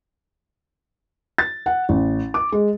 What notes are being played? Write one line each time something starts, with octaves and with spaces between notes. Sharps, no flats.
A6
F#5
A1
D6
G#3